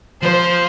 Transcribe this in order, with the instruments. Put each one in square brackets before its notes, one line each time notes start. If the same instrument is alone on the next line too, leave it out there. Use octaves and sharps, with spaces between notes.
[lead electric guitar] F3 [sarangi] C5